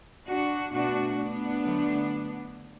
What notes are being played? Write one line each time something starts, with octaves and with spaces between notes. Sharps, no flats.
D4 F#4
B2 A3 D4 F#4
B3 D4
D3 F#3 A3